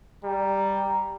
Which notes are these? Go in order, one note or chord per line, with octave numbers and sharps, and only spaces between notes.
G3 A#5